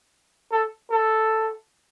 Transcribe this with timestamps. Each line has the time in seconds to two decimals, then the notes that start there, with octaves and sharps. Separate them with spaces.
0.51 A4
0.91 A4